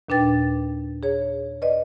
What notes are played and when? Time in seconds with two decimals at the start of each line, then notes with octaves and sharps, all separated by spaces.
0.09 D#2 A#2 D4 B4 G5 A6
1.03 G#4 C#5
1.62 B4 D5 D#5